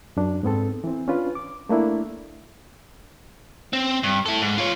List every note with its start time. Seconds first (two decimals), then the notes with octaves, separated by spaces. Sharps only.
0.17 F#2 D4
0.43 G#2 B3 C4 A4
0.84 E3 C4
1.08 C#4 D4 F4 B4
1.35 D6
1.69 A3 A#3 D4 E4
3.73 C4
4.03 G2
4.26 E4 A4
4.41 G#2
4.58 F4 C#5